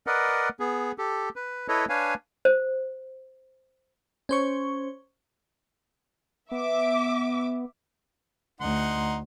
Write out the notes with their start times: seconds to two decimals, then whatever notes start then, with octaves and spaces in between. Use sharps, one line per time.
0.07 A#4 B4 D5 D#5 F#5
0.60 B3 G#4
0.98 G4 A4
1.36 B4
1.68 E4 A4 B4 C#5 D#5
1.89 D4 B4 C#5 F5 G#5
2.45 C5
4.29 C#4 C5 C#6
6.51 B3 E5 D6
8.61 D2 D#4 F#5 C6